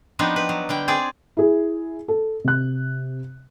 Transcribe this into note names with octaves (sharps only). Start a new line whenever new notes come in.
F3 B3 C4 D4 D#4
B4
F#3
D3 G3 G5
C4 G#4 D5
E4 G#4
A4
C3 F#6